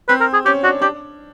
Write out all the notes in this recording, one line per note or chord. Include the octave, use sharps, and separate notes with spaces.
C4 B4
A#4
G#4
C#4 G4
D4 F#4
D4 G4